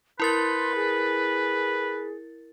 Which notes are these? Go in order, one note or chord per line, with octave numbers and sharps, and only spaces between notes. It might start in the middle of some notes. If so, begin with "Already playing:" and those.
E4 A#4 B4 C6 A6
G#4